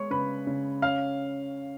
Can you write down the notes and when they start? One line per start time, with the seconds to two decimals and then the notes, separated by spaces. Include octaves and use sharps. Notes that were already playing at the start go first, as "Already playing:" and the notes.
Already playing: G#3 B3 C#5 C#6
0.11 C#3 B4 B5
0.47 C#3
0.82 C#4 F5 F6